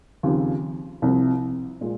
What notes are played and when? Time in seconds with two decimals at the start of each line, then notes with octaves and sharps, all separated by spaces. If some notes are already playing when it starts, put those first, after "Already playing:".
0.23 D#2 C#3 F3 C4 G4
1.02 C2 C3 F3 C4
1.81 A#2 G#3